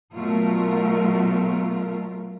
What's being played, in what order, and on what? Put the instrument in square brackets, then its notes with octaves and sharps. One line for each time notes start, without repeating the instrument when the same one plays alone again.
[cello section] B2 F#3 A3 F4 A#4